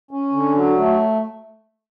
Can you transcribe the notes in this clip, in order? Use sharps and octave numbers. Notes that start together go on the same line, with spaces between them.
C#4
D3
F#3
A3